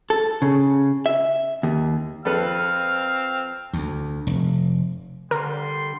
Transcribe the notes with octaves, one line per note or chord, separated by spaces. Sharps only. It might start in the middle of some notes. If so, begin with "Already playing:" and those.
A4
C#3
E5
D#2
F2 C4 A4 B4 F5 F6
D2
F1
D3 G3 A#4 C6